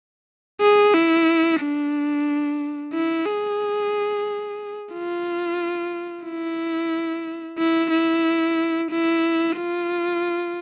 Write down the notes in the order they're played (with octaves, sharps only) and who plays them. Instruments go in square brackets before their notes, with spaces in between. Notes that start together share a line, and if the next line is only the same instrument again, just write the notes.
[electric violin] G#4
E4
D4
E4
G#4
F4
E4
E4
E4
E4
F4